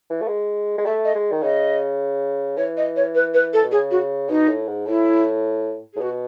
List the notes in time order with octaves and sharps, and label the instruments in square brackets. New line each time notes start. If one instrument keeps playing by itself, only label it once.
[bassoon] E3
A3
G#3
G#3
[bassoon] A3 [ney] E5
[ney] D#5
[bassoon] G#3
D#3
[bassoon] C#3 [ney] D#5
[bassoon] E3 [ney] C#5
[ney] D#5
C#5
B4
B4
A4
[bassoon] B2
[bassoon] C#3 [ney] G#4
[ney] F#4
[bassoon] B2 [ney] D#4
[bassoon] A2
G#2
[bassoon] A2 [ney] E4
[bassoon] A2 [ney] G#4
[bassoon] B2 [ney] F#4